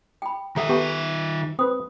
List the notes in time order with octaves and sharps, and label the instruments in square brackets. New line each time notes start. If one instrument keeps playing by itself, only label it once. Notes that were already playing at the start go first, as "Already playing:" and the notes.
[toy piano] G5 B5
[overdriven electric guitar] D#3 E5 [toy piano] A4 F#5 A#5
[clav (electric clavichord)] B3 G4 A4 [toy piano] C#6
[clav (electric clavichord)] C4 B4 [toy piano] D#6